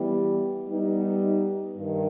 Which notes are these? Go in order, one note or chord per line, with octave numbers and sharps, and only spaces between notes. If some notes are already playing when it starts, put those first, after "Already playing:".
Already playing: E3 G3 B3
G3 B3 D#4
G2 D#3